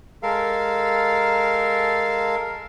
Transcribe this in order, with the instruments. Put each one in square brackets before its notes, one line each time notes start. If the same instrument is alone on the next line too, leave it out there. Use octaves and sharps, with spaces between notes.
[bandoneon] G#3 A4 A#4 F5